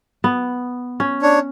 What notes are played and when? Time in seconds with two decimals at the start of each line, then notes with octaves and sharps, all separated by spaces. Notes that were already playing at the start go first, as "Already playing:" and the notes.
0.24 B3
1.00 C#4
1.22 D4 C#5